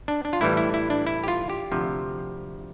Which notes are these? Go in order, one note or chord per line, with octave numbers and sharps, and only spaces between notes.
D4
D4
F4
A2 E3 G3 E4
E4
E4
D4
E4
G4
F4
G4
D2 C3 F3